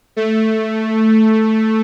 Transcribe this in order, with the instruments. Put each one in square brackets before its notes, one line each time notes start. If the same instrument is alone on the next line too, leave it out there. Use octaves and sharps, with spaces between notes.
[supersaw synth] A3